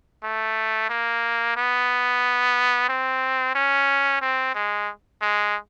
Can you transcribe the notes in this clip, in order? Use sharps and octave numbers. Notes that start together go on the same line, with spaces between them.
A3
A#3
B3
C4
C#4
C4
G#3
G#3